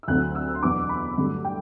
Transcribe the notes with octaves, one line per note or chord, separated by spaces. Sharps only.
E6
D2 D3 F#3 C4 F#6
E6
C6
E2 B2 F#3 B3 D4 D6
B5
G2 D3 F#3 A3
G5